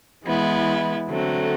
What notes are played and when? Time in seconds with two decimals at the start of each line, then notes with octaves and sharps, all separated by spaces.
0.25 E3 G#3 B3 E4
1.09 D3 F#3 A3 C4